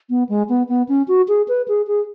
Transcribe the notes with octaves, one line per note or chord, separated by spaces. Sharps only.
B3
G#3
B3
B3
C#4
F#4
G#4
B4
G#4
G#4